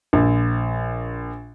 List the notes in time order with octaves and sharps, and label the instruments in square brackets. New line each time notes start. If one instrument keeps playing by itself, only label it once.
[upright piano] A#1